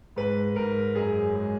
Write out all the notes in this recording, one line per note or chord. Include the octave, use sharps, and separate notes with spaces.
G#2 B4
G#2 A#4
F#2 G#4
G#3